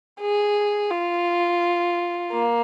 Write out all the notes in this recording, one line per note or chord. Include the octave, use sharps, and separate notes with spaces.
G#4
F4
A#3